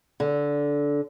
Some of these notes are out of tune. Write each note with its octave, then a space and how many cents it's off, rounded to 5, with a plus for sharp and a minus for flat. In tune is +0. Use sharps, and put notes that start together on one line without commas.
D3 -15